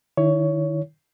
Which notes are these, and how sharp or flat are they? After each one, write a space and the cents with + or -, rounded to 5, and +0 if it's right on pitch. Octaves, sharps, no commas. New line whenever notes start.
D#3 -30 E4 +0 C#5 +15